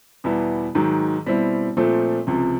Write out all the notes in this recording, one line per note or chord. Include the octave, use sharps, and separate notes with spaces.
E2 B2 G3 B3 E4
G#2 D#3 F#3
B2 G3 C4 E4
A#2 F3 A3 C4
C#2 C3 F3